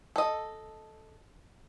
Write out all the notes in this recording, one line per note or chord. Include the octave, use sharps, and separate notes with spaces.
A4 D#5